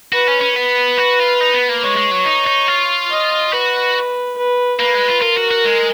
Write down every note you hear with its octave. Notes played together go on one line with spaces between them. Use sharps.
F#4 B4
C#4
C#4
B3 B4
F#4
F4
D#4
B3
A#3
G#3 C#5
G#3
F#3
D#4
D#4
F4
D#5
F#4 B4
B4
A#3 B4
G#3
F4
F4 A#4
F#4
F#4
G#3